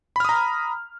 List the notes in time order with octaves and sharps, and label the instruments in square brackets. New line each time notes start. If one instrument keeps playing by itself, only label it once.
[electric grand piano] B5
F6
D#6
A#5